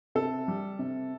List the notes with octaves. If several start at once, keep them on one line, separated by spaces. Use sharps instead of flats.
C3 A4
G3
C3